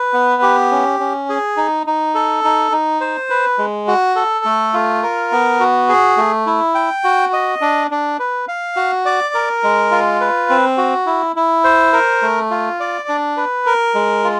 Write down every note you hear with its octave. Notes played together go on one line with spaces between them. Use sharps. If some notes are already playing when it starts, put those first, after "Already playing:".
Already playing: B4
B3
G4
C#4
C#4
G#4
D#4
D#4
A4
D#4
D#4
C5
B4
G#3
F#4
A4
A3
F4
A#4
B3
F#4
G#4
A3
E4
G5
F#4
D#5
D4
D4
B4
F5
F#4
D5
A#4
G#3
F4
B4
C4
F#4
E4
E4
C5
A#4
A3
F4
D5
D4
B4
A#4
G#3
F4